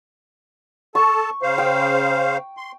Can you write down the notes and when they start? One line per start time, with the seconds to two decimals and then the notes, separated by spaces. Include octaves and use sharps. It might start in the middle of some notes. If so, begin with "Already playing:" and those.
0.95 A4 A5 C#6
1.42 C#3 C5 F5
1.58 G5
2.57 C6